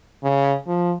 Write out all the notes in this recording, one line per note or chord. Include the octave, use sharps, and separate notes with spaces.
C#3
F3